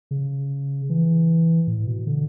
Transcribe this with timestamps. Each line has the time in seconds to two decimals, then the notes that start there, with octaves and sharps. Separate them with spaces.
0.11 C#3
0.90 E3
1.67 A2
1.87 B2
2.07 D3